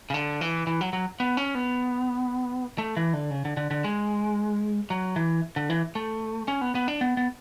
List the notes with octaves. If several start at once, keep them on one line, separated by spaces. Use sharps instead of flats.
C#3
D3
E3
E3
F#3
F#3
B3
C#4
B3
A3
E3
D3
C#3
D3
D3
D3
G#3
F#3
E3
D3
E3
A3
C#4
B3
B3
D4
B3
B3